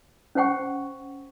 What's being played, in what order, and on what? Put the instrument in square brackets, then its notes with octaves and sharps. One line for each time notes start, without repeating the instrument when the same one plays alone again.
[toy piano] C#4 C5 F#5 G5 C#6